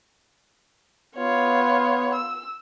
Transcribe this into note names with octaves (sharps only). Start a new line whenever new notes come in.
B3 F4 C#5
E6